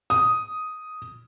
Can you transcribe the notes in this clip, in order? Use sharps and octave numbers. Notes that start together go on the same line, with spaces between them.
D#6